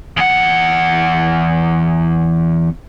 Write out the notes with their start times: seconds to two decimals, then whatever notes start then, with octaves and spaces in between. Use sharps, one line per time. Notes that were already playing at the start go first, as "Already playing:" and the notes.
0.17 E2 F#5